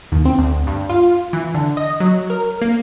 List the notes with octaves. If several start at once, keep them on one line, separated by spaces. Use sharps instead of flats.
D#2
C4
D2
G2
F4
E3
D3
D#5
F#3
A#4
A#3